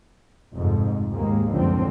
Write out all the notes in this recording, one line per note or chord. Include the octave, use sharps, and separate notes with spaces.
F1 F2 G#2
D#2 G#2 G#3 A#3
C#2 F#2 A2 D3 F3 C4